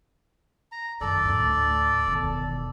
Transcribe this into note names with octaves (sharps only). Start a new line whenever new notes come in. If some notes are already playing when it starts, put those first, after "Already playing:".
A#5
F#2 D#3 A4 D5
D2 A2
E1 D#3